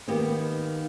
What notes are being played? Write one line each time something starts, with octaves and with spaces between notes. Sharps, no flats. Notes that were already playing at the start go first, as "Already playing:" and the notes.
D#3 A#3 B3 G4